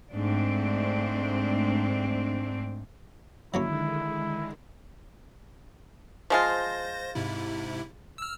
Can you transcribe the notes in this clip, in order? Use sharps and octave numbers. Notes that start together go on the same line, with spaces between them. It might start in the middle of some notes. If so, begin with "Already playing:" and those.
G#2 A3 C4 D4
D3 D#3 F#3 G#3 A#3 C#4 E4
F3 G#3 F4 C5 A#6
G#2 C3 E4
E6 F6